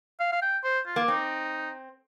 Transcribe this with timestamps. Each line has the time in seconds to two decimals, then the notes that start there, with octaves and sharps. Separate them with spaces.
0.20 F5
0.32 F5
0.42 G5
0.64 C5
0.86 F4
0.96 A#3
1.08 C4 D#4